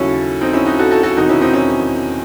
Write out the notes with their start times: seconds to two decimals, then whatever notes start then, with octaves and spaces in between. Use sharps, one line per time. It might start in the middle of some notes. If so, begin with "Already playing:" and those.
Already playing: D#2 C#3 F#3 C#4 E4 F#4 A4
0.41 C4 D#4
0.53 C#4 E4
0.66 D#4 F#4
0.79 F#4 A4
0.91 F#4 A4
1.03 F#4 A4
1.16 E1 E2 C3 D#3 D#4 F#4
1.29 C#4 E4
1.41 C4 D#4
1.54 C#4 E4